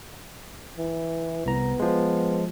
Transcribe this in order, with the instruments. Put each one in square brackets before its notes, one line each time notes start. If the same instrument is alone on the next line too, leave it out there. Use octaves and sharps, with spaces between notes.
[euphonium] E3
[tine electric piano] C2 A#5 [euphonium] B3
[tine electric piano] F3 G#3